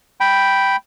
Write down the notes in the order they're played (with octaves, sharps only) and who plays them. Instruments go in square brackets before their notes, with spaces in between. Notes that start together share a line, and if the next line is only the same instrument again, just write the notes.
[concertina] G5 B5